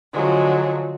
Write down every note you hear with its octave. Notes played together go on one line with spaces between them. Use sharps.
D3 F3 F#3 G#3